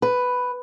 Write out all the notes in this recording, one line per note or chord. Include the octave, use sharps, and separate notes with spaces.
B4